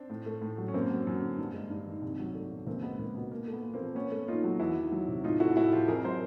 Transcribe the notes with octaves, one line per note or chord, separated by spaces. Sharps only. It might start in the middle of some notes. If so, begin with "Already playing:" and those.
Already playing: C4 D4
A2
A3
A2
F#3
C#4
F#2 A#3 C4
F#3
F#2
D3
G2
G#3
G2
D#3
C2
F#3
A3
B2
C#2 A#3 C4
G#3 B3
C#2 A#3
B2 B3
A#2 A#3
A3
B3
A#2
A#3 C4
F3
A#2 B3 C#4
A3
A#2 D#4 F4
F#3
E2 E4 F#4
D#3
F#3
C3
A2 D#4 F4
A3 E4 F#4
A2 E4 F#4
F3 F4 G4
F2 G#4 A#4
F#3 A#4 C5